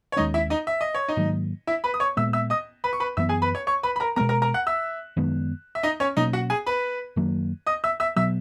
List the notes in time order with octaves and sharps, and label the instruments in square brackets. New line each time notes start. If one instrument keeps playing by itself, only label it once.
[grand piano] C#5
[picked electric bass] D#2 D#3 G#3 C#4 [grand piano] D#4 D#5
[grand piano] E4 E5
D#4 D#5
E5
D#5
C#5
D#4 D#5
[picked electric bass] G#2 D#3 F#3 A#3
[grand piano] E4 E5
B4 B5
D#6
C#5 C#6
[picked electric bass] A#2 G#3 B3 [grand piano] E5 E6
[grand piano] E5 E6
D#5 D#6
B4 B5
C#6
B4 B5
[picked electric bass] F#2 E3 B3 [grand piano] E5 E6
[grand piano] G#4 G#5
B4 B5
C#5 C#6
C#5 C#6
B4 B5
B5
A#4 A#5
[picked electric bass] B2 G#3 B3 [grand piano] A#4 A#5
[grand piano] A#4 A#5
A#4 A#5
F#5 F#6
E5 E6
[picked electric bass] F#2 D#3 G#3 B3
[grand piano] E5
D#4 D#5
C#4 C#5
[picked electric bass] B2 F#3 A#3 C#4 [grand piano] D#4 D#5
[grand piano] F#4 F#5
G#4 G#5
B4 B5
[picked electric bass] F#2 D#3 F#3 A#3
[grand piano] D#5 D#6
E5 E6
E5 E6
[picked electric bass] B2 F#3 B3 [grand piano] E5 E6